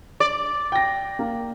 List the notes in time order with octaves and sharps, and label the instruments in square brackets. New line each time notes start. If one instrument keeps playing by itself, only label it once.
[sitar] D5
[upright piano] G5 A#6
A#3